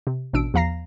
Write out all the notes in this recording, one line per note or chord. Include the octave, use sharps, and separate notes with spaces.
C3
A1 B2 D4 E6 D7
E2 F3 F5 A#5 A#6 C7